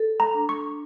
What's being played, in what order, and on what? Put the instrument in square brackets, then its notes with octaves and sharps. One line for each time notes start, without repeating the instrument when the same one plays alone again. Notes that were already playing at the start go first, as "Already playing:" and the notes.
Already playing: [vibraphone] A4
[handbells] A#5
[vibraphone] D4
[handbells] C#6